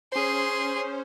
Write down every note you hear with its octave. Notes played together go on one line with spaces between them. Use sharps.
C#4 G#4 C5 C6